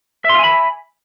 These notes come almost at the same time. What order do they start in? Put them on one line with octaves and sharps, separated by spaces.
E5 C6 F5 G#5 B5